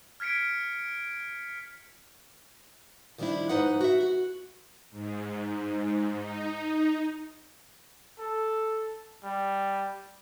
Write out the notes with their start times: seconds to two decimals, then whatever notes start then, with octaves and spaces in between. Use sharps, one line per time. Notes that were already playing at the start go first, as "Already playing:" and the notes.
0.20 F6 G#6 B6 C#7 D7
3.18 D#3 F3 G3 C#4 D4 E4
3.49 G#2 F3 D#4 B4 F#5
3.81 F#4 E5
4.00 F#4
4.91 G#2
6.15 D#4
8.19 A4
9.24 G3